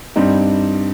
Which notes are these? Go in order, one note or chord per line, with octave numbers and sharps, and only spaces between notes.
G2 G3 C4 D#4